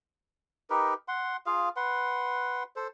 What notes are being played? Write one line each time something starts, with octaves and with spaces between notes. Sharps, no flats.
D#4 G4 A#4 B4
F#5 C6
F4 G#4 F5
B4 F#5 C6
A4 C5